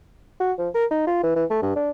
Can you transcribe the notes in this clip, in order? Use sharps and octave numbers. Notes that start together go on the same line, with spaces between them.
F#4
F3
A#4
D#4
F4
E3
E3
A3
G2
D4